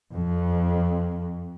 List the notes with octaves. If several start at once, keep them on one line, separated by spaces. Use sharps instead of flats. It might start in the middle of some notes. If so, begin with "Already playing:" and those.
F2